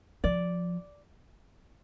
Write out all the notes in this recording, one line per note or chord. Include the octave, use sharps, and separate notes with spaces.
F3 D5